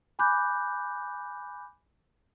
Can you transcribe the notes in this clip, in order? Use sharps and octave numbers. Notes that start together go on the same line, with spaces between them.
G#5 B5 D6 F#6 G6